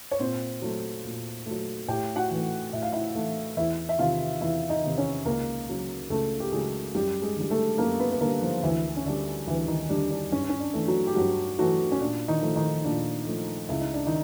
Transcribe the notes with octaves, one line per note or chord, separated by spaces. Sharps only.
C#5
A#2 C4 C5
F#3 A3
A#2
F#3 A3
A2 G4 G5
F#4 F#5
E3 A3
A2 E5
F5
E4 E5
E3 A3
E2 E4 E5
E5
C3 D#3 F4 F5
E2 E4 E5
D#4 D#5
C3 D#3
C#4 C#5
C#2 A#3 A#4
C#3 F#3
C#2 A3 A4
G4
C#3 F#3 G#3 G#4
F#2 G3 G4
G#3 G#4
D3 G3
A3 A4
F#2 A#3 A#4
B3 B4
B4
D3 G3 A#3 A#4
F3 F4
D2 E3 E4
C#4
D3 G3 D4
D2 E3 E4
D#3 D#4
D3 G3 D4
D4
G2 C#4
C#4
D4
E3 A3
F#3 F#4
G4
G2 F#3 F#4
E3 F#3 A3 F#4
C#4
A#2 D4
D#3 D#4
F3 A3
D#3 D#4
A#2 D4
F3 A3
C#2 E4
D#4
D4
D#3 D#4